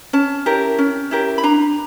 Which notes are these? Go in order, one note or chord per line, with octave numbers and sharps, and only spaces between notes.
C#4 A5
E4 G4 A#4
C#4
E4 G4 A#4
B5
D4 A#5